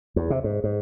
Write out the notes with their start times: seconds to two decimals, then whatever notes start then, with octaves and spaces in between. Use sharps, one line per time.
0.16 E2
0.30 C3
0.44 G#2
0.64 G#2